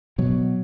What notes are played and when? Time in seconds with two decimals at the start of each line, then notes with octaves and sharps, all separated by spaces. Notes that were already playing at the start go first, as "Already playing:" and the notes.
0.18 B2 F#3